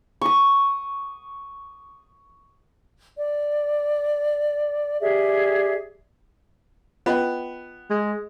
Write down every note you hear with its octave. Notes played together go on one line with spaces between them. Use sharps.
C#6 D#6
D5
G4 G#4 D5 E5
B3 F4 D#5 G5
G#3